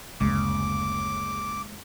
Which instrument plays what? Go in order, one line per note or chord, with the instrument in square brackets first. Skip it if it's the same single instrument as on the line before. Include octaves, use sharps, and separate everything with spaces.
[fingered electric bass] F#1 D2 [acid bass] C#3 [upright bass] G#3 A#3 [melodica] D6